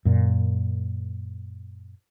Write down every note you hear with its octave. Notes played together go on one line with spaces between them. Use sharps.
F#2 A#2